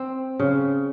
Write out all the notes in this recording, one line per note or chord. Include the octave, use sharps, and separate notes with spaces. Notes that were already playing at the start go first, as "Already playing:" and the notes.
Already playing: C4
C#3